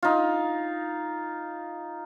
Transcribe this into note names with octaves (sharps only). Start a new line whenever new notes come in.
D#4 F4